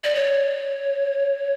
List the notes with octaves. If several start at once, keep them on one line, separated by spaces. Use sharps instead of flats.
D5
C#5